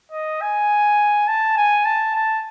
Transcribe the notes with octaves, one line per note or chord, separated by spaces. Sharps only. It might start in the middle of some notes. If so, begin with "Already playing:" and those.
D#5
G#5
A5
G#5
A5
A5